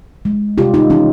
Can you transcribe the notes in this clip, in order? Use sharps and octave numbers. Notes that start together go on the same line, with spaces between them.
G#3
C3 F4 G4
D#4 F4
E3 C#4 D#4